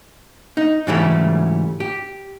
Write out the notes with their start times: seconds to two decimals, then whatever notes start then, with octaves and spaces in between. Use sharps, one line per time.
0.57 D#4
0.87 G#2 C#3 E3 F#3 G3 A3
1.80 G4